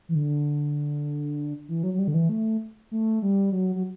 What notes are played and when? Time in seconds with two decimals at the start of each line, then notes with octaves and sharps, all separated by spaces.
0.09 E3
0.15 D3
1.68 E3
1.83 F#3
1.94 F#3
1.99 G3
2.08 D3
2.14 E3
2.29 A3
2.91 A3
3.22 G3
3.52 F#3
3.76 F#3